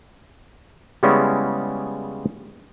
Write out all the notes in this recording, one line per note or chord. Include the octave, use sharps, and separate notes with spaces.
C#3 G3 G#3 B3 C#4 E4